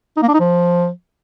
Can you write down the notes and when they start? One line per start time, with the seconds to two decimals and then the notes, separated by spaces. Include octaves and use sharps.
0.17 D#4
0.22 A#3
0.28 D4
0.34 D#4
0.40 F3